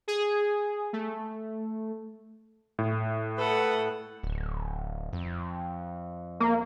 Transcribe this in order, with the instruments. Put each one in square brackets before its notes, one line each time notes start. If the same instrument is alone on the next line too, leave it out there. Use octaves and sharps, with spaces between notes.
[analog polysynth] G#4
A3
[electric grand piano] A2
[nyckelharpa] A4 F#5 [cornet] B4
[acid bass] D1
F2
[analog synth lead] A#3